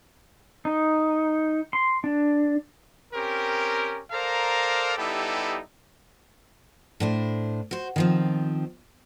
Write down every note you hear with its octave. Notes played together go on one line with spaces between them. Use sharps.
D#4
C6
D4
C4 C#4 G4 A#4
A4 A#4 C5 D5 F5 A#5
G3 B3 D#4 E4 G4 A4
A2 D4 C5
F#4 C5
D#3 F3 C4